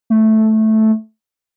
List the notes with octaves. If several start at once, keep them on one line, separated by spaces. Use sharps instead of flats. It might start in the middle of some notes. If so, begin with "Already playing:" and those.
A3